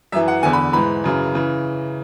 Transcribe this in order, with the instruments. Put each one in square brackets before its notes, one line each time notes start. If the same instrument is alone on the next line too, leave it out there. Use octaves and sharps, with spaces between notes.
[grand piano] F#2 E3 E5
F#5
E2 D3 G#5
B5
G#2 E3 B5
F#2 C#3 E3
C#3 E3